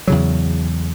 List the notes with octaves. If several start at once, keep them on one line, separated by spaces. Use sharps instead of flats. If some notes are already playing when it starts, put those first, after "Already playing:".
E2 C#3 F#3